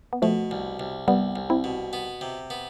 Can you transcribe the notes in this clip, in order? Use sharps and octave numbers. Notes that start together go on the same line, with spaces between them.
B3
B2 F3 A3
C2
C2
C2 G3 B3
C2
C4 E4
B2
B3
C3
B3